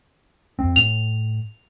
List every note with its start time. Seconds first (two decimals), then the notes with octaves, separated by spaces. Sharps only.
0.59 F2 C4
0.76 A2 F7